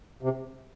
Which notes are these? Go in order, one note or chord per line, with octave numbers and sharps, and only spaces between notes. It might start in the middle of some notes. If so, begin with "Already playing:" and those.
C3